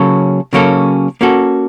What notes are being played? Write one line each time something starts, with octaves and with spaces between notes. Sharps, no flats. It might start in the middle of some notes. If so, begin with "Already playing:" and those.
Already playing: C#3 F#3 A#3 C#4 A4
C#3 F#3 A#3 C#4 A4
A#3 C#4 F#4 A4